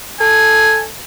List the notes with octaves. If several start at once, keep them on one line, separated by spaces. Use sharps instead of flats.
A4 G#5